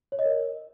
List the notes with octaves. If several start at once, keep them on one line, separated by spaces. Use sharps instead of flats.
C#5
D#5
A#4